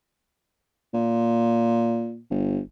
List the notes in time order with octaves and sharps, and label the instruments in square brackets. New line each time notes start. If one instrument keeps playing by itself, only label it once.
[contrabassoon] A#2
G1